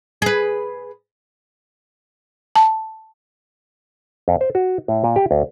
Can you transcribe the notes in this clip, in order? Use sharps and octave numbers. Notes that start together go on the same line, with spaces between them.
G#4 B4
A5
F2
C5
F#4
A2
A#2
G4
D2